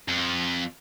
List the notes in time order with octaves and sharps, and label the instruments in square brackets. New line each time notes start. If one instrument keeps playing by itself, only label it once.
[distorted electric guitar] F2